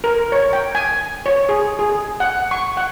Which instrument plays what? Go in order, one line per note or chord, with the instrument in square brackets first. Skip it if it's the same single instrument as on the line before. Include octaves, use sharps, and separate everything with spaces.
[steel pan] A#4
C#5
G5
G#5
C#5
G#4
G#4
F#5
C#6
F#5